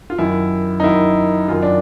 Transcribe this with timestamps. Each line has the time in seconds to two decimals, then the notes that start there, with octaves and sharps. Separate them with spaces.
0.10 F4
0.18 F#2 D#3 E4
0.80 D#4
0.83 F#2 D#3 E4
1.48 F#2 D#3 F4
1.62 D4